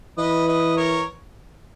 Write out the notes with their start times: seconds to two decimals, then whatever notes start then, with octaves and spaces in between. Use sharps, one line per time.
0.18 E3 B4 D#5
0.47 B4 D#5
0.76 A#4 C#5